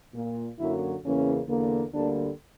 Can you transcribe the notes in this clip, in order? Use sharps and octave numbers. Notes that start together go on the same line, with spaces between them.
A#2 A#3
F#2 D3 F#3 A#3 E4
E2 C#3 E3 A#3 C#4
E2 D3 A#3
D2 D3 G3 A#3 D4